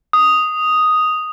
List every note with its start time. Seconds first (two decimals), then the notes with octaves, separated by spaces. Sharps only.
0.13 D#6